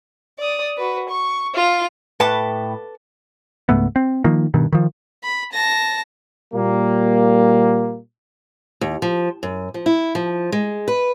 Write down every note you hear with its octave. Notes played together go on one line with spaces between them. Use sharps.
D5 D#6
F#4 B4
C#6
F4 F7
A2 A4 B4 E5 G5 A5 D6
C#2 G#2 A3 B3
C4
D#3 F3 A#3
G2 B2 D#3
D#3 F3
B5
A5 A#6
A#2 G3 A#3
D#2
F3
F#2
F3
E4
F3
G#3
B4